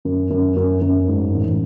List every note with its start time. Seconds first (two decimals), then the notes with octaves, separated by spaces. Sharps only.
0.05 F#2
0.30 F#2
0.56 F#2
0.81 F#2
1.08 G#2
1.34 A1